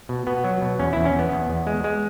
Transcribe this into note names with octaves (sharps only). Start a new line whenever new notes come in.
B2
B2 B3
F#3
B2
E2 C#4
E2 E4
C#4
E2 B3
E2
E2
G#3
G#3